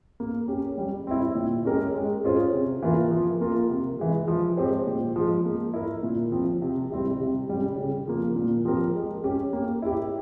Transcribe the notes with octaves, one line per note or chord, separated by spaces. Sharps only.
A#3
C#4 G4
G3
C4 E4
A#2
G#3 C#4 G4 A#4
G#3
C#4 F4 G#4 C5
C3
E3 A#3 F4 A#4
F3
A#3 F4 A#4
C3
E3 G#3
F3
G#3 C4 G4 C5
A#2
F3 G#3
A#3
E4 A#4
A#2
F3 C4
C3
G3 C4 E4 G4
C3
G3 C#4
C#3
F3 A#3
A#2
F3 C4 G4 A#4
G#3
C#4 G4
A#3
E4 G4